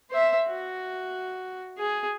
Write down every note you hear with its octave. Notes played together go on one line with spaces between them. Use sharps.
C5 E5
F#4
G#4